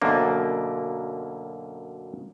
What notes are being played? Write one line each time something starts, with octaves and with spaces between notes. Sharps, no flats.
F#2 B2 D3 A#3